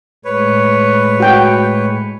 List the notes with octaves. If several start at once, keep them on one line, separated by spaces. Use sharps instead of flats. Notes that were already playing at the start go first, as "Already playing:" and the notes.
A2 G#3 B4 C#5
F#4 G5